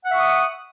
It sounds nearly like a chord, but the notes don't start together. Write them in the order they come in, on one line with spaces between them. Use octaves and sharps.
F#5 E5 C#6 D#6